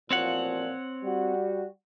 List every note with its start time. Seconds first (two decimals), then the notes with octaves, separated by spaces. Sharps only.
0.11 A1 A#2 F3 C4 C#5 F#5
1.03 G3 F#4